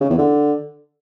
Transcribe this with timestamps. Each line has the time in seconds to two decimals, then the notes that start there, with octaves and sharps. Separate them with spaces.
0.01 C#3
0.09 E2
0.18 D3